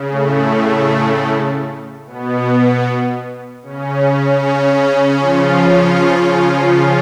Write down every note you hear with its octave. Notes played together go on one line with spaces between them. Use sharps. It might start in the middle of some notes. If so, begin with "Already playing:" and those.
Already playing: C#3
A2 A3
B2 B3
C#3 C#4
C#3 C#4
F3 F4